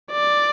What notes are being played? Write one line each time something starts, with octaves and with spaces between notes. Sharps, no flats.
D5